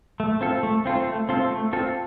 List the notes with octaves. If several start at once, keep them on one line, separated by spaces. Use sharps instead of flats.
A3
C4 F4 A4
A3
C4 F4 A4
A3
C4 F4 A4
A3
C4 F4 A4